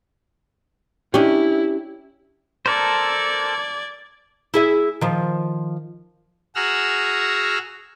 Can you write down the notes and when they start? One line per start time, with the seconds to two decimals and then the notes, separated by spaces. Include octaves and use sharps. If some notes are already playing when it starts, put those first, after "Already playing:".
1.14 C#4 D4 E4 G4
2.66 A4 A#4 C5 D5 G#6
4.54 E4 G#4 E5
5.01 D#3 F3
6.55 F#4 G#4 F#5 A#5 E6 F6